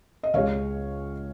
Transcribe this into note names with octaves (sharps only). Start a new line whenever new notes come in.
D#5
C#2 C#3 G#3 C#5 F5